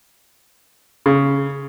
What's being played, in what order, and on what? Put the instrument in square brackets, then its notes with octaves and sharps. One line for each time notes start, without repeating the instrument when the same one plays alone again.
[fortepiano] C#3